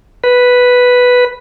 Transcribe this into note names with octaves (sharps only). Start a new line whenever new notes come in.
B4